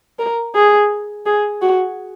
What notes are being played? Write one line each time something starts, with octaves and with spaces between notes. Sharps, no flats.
A#4
G#4
G#4
F#4